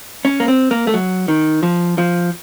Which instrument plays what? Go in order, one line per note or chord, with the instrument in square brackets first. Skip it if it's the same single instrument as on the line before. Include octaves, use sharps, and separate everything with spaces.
[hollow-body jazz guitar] C#4
A#3
C4
A#3
A3
F#3
D#3
F3
F3